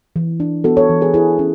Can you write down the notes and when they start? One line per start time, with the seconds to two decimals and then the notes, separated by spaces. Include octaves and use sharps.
0.16 E3
0.40 D4
0.64 B3 F#4 A4
0.77 A4 C#5
0.90 E3
1.02 G#4 B4
1.14 E4 G#4 B4
1.39 C#4